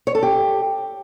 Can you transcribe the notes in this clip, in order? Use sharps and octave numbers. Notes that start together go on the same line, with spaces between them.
C#5
A4
G4